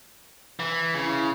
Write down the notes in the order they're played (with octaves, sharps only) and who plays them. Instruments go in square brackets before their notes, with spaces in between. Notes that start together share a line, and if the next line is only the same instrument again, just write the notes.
[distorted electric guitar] E3
[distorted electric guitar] C#3 [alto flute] E4